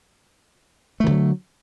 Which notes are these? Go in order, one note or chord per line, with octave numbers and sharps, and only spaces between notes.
D3 D#3 F#3 A3